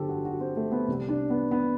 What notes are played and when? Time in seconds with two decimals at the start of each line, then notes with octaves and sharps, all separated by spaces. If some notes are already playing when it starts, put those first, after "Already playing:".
Already playing: G1 G2 D3 F#3 G4 A4 C5
0.09 F#4
0.25 F#4
0.40 C4
0.57 A3
0.72 B3
0.88 C2 C3 G3
1.09 D4
1.30 B3
1.51 B3